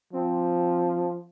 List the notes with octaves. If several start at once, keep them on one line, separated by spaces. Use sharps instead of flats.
F3 C4